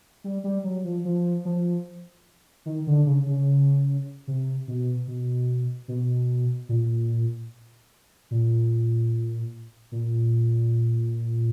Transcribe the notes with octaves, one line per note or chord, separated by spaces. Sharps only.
G3
G3
F#3
F3
F3
F3
D#3
D3
C#3
C#3
C3
B2
B2
B2
A#2
A#2
A#2